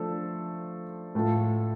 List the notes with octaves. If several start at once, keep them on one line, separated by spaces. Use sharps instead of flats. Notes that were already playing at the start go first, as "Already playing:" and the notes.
Already playing: F3 A3 D4 A4 C5
A2 A3 F4 A4